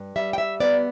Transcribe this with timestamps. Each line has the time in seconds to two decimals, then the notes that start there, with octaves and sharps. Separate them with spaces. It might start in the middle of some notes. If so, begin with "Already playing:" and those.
Already playing: G2
0.16 G3 E5
0.33 G5
0.38 E5
0.60 B3 D5